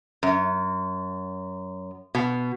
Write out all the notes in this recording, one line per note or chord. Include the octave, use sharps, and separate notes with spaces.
F#2
B2